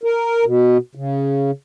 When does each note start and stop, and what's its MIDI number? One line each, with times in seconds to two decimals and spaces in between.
0.04 0.44 70
0.45 0.77 47
0.95 1.51 49